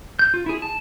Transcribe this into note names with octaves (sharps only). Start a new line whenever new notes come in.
G6
F4
E4 G#4
A5